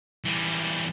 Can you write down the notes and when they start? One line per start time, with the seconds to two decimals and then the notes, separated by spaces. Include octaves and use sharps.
0.25 E2 G3